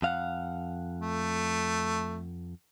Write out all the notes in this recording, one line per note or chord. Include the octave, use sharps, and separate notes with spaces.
F2 F5 F#5
A3